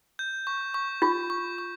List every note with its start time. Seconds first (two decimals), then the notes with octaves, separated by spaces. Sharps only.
0.19 G6
0.47 C#6
0.74 C#6
1.02 F4 C#6
1.30 C#6
1.58 C#6